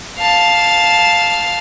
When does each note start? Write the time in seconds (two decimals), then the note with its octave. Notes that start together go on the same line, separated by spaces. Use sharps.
0.18 F5 A5